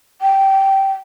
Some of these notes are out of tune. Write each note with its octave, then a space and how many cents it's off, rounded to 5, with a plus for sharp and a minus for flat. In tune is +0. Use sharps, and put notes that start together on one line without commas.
G5 -15